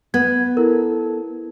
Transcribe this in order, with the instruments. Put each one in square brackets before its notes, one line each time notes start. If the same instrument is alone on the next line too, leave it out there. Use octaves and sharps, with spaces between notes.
[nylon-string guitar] B3 [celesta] G#6
[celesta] E4 A#4 [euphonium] A4